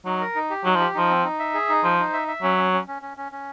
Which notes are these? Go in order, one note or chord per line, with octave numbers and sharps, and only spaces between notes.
F#3 D#4
A#4
D#4
G4
F#3 D#4
F3 G4
F3 D#4
C4
D#4
E5
G#4
D#4
F3 C5
D#4
E5
E5
F#3 C#4
C#4
C#4
C#4
C#4
C#4
C#4